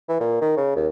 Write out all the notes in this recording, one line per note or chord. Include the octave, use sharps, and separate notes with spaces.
E3
A#2
D#3
C#3
D#2